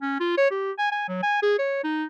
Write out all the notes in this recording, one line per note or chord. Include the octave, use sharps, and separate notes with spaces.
C#4
F4
C#5
G4
G#5
G#5
F#3
G#5
G#4
C#5
D#4